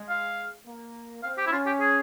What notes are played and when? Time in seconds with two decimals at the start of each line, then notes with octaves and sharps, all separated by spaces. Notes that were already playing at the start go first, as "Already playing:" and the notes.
Already playing: G#3
0.09 F5
0.66 A#3
1.23 C4 F5
1.38 G4
1.47 E4
1.51 C#4 F4
1.66 G4
1.80 G#4